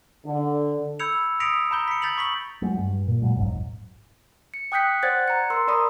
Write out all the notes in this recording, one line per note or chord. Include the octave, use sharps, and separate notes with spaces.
D3
B5 E6 G6 G#6 C#7 F7
D#6 A#6 B6 C#7 D7 F7
A#5 B5 G6 G7
B6 C#7
G6 A6 B6 F7 F#7
C#6 B6 F#7
F#3 G#3
G2
A#2
A#2 F#3 G#3
E1 A1 G#2 F#3
C#7
G5 D#6 F#6 G6 B6 C#7
C5 D5 F#5 F#6 G#6 A6
A#5 C#7
A#4 C6 E6
A#4 D5 A#5 B5 D#6